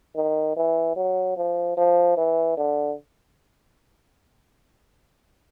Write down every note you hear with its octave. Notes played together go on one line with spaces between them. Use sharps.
D#3
E3
F#3
F3
F3
E3
D3